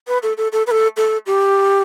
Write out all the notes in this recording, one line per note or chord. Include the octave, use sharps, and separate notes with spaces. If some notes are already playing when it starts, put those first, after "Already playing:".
B4
A4
A4
A4
B4
A4
A4
G4